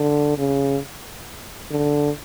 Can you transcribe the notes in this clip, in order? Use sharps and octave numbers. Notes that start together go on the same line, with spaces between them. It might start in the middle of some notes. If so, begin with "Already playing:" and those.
Already playing: D3
C#3
D3